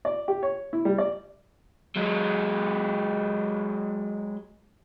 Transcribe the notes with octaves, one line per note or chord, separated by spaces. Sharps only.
D5
G4
C#5
E4
G3
D5
F#3 G#3